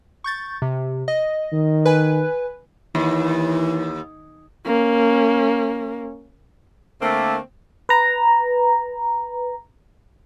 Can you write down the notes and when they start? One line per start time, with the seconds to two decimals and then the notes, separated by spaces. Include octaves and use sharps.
0.24 C#6 G6 A6
0.62 C3
1.08 D#5
1.52 D#3
1.85 B4 G#5
2.95 D#2 E3
4.65 A#3 C#4
7.02 D3 A3 A#3 C4
7.89 B4 A#5